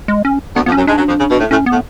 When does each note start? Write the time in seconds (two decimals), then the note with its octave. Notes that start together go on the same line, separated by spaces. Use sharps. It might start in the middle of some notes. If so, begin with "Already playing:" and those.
0.08 G#3
0.25 C#4
0.56 D2 D3 B3
0.66 F2 F3 B3
0.72 C#4
0.77 F#2 F#3
0.87 G#2 G#3 D4
0.98 F#2 F#3
1.08 F2 F3
1.20 C#3
1.31 B2
1.40 A2
1.51 A2 C#4
1.66 B3
1.73 A2